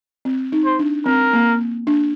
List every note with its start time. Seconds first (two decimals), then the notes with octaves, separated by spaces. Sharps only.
0.25 C4
0.52 D#4
0.66 C5
0.79 D4
1.06 C4 A#4
1.33 A#3
1.87 D4